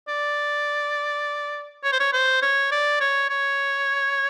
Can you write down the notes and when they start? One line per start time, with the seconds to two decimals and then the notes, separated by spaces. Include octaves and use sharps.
0.08 D5
1.84 C#5
1.92 C5
2.00 C#5
2.13 C5
2.42 C#5
2.71 D5
3.00 C#5
3.30 C#5